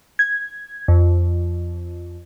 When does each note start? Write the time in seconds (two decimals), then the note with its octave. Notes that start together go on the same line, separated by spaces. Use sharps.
0.19 G#6
0.88 F2